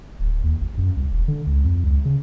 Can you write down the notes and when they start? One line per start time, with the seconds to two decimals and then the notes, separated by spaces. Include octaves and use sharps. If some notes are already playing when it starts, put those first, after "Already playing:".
0.20 D1
0.44 D#2
0.60 G1
0.78 F#2
0.96 C2
1.11 E1
1.28 D3
1.47 C#2
1.64 F2
1.84 C#2
2.05 C#3